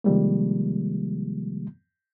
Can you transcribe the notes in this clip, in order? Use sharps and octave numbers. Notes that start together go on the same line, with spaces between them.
C3 D#3 F3 G3 G#3 A#3